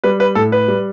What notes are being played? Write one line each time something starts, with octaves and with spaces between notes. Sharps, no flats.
G3 B4
B4
A2 A4
B4
G3